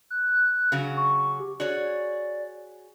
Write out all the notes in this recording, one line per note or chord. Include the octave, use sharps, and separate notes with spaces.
F#6
C#3 F#3 F#4
C#6
G4
F#4 G#4 C#5 D5